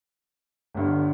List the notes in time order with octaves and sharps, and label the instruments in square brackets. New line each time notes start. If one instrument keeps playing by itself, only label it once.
[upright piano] G1 G2 D3